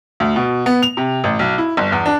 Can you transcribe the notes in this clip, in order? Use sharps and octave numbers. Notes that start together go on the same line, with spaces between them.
D2
B2
B3
F7
C3
A1
B1
E4
G1
E2
D4